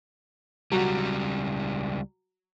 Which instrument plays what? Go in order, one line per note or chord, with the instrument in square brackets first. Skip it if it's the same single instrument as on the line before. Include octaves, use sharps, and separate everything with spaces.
[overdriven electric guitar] C#2 G3 [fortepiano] F#3 F#4